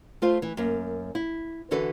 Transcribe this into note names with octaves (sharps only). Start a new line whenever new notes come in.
A3 F4 C5
E3
F#2 A#3
E4
D3 E3 F#4 A4 B4